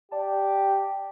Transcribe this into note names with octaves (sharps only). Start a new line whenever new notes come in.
G4 D5 A5